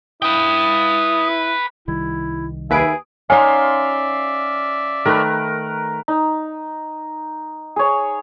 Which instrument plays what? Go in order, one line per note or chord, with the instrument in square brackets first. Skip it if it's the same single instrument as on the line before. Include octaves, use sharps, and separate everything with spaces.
[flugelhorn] E4 [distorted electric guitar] B4 G5 [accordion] D#6
[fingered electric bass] C2 D#3 G3 [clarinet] E4
[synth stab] D#2 B4 D7 [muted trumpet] G#4 [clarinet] E5
[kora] C#4 D#4 [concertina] D5 E5 [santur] F5 C6 [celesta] G#5
[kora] D#3 A3 [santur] A#4 B4
[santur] D#4
G#4 C#5